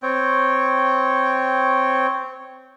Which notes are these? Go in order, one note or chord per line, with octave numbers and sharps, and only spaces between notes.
C4 C#5 G5